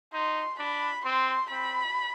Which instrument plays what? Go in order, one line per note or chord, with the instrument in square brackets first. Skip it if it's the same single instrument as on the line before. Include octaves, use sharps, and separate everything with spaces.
[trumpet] D#4 [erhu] C6
[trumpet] D4 [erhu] B5
[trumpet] C4 [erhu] C6
[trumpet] C4 [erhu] B5